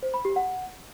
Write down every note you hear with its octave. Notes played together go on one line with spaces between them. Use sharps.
C5
B5
G4
F#5